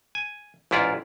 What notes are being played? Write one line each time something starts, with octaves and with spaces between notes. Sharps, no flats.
G#5
A1 G#2 E4 F4 D5